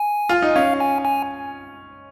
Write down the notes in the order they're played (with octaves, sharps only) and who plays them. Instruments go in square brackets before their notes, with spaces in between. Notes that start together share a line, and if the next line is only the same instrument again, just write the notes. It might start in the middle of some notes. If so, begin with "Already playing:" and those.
Already playing: [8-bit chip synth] G#5
[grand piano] F4
D#4
[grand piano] C#4 [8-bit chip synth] F5
[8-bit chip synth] G#5
G#5